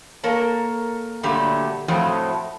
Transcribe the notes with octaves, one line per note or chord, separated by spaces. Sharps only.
A#3 A4 A#4 C#5
A#2 D3 F#3 G3 A3 G4
F2 A2 F3 F#3 A3 G5